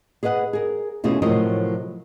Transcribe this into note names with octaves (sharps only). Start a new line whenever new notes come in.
G#4 B4 D#5 F5 F#5
G#4 A#4
E2 B2 A3 C#4 F4 G#4
A2 C3 F3 F#3 A#4 D#5